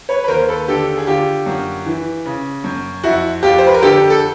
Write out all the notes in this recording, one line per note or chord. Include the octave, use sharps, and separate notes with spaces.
B4 C#5
B4
D#2 A#4 C5
A4 B4
D3 G4 A4
G#4
D3 F4 G4
F#2
E3
C#3
F#2
F2 E4 F#4
F2 F4 G4
C5
B4
A#4
D3 G4 A4
A4